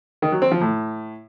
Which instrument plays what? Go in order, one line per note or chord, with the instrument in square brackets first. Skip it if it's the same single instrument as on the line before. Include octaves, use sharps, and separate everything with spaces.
[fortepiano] D#3
F#3
C4
F3
A2